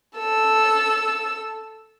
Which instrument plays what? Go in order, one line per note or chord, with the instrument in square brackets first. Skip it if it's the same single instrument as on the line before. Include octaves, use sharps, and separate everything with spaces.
[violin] A4 E6